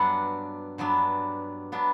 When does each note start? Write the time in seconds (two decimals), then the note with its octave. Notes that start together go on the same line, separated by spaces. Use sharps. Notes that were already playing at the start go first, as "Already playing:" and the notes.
Already playing: G2 F#3 B3 D4 F#5
0.78 G2 F#3 B3 D4
1.72 F#3 B3 D4